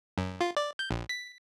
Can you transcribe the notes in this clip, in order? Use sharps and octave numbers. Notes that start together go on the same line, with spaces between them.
F#2
F4
D5
G6
A#1
B6